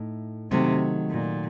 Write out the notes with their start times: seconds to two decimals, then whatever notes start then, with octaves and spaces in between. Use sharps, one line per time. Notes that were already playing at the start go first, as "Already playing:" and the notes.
Already playing: A2 A3 D#4
0.51 C3 D#3 F#3 A3
1.11 A#2